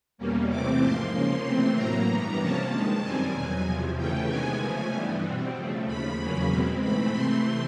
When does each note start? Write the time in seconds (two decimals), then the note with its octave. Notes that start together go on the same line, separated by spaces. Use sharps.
0.18 E2 B2 G3 A#3 C#4
0.49 C3 E3 A3 C4 D6
0.81 G#2 F3 A#3 C6
1.13 C#3 F3 A#3 C#4 C6
1.45 C3 E3 A3 C4
1.75 A2 F#3 A#3 A#5
2.08 G2 E3 G3 B3
2.39 C3 F3 A#3 C#4 A5
2.70 G2 D#3 G#3
3.02 F#2 D#3 G3 C4 G#5
3.33 E2 B2 F#3
3.65 E2 C3 F3
3.97 C#3 E3 A3 C#4 G5
4.28 C3 D#3 G#3 B3 G#5
4.60 C#3 F3 A3 G#5
4.92 G2 E3 G3 B3
5.23 B2 G3 C4
5.55 C#3 F3 A3
5.86 D#2 C#3 F3 B5
6.18 E2 C#3 F#3 A#3 C#4
6.49 B2 G#3 C4
6.81 G#2 E3 A3 C4 B5
7.13 C3 E3 A3 C4 C6